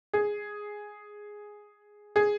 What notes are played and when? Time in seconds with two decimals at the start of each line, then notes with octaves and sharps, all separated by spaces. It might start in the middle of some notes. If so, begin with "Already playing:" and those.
0.13 G#4
2.16 G#4